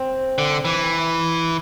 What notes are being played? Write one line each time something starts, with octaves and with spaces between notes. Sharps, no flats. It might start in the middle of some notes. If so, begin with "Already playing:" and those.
Already playing: C4
D3
E3